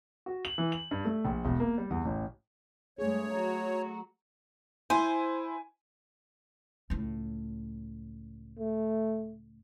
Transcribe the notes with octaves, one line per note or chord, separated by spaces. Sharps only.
F#4
F#7
E3
F#7
G2
A3
A#1
E1
A#3
G3
E2
A1
G2 G#3 A3 G#4 C#5
F#3 F#4 A#5
E4 C5 G#5 D#7
C#2 A2
A3